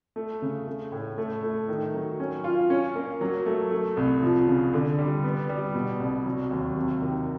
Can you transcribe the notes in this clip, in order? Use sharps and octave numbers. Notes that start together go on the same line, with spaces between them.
A3
C#3
A3
A2
A3
A3
D#3
F#3
C#4
F4
C#4
A#3
F#3
A3
A3
C2
F3
C#3
D3
G3
B3
G3
B2
C2
F#3
D#2
C3
D#3